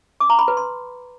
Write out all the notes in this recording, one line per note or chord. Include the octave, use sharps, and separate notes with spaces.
D6
A#5
B5
B4
C6